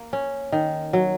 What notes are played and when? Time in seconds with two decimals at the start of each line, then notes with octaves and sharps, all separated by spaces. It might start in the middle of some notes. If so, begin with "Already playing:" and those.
Already playing: A#3
0.13 C#4
0.52 D#3
0.93 F#3